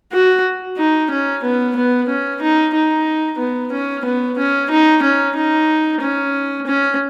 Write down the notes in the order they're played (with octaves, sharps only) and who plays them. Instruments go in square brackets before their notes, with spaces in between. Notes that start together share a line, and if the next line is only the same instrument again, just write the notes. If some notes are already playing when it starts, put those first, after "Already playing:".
[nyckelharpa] F#4
D#4
C#4
B3
B3
C#4
D#4
D#4
B3
C#4
B3
C#4
D#4
C#4
D#4
C#4
C#4